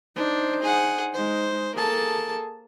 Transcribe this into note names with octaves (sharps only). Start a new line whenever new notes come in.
D4 D#4 C5
G#4 F#5
G#3 D#4 C5
A#3 G#4 A4 A5